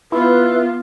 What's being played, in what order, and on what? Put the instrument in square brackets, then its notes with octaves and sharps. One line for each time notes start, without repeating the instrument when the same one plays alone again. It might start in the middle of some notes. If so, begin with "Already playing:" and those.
[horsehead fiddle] B3 F4 [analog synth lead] E4 [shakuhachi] B4